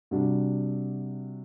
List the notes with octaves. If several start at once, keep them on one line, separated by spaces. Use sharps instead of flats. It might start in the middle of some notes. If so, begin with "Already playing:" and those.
C3 G3 D4 F#4